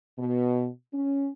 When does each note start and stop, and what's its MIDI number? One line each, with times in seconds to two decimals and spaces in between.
0.18 0.67 47
0.93 1.29 61